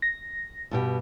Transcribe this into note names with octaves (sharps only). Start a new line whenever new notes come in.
A#6
G2 B2 G4